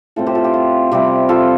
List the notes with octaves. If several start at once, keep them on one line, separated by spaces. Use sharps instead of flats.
A2 A3 C4 F4 A4
G4 C5
F4 A4
G4
F4
C3 G3 C4 G4
F4 A4